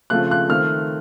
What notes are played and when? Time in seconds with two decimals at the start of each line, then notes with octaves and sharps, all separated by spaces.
0.10 C#3 F3 A3 C4 F4 F#6
0.31 F#6
0.49 D#3 A3 C4 F6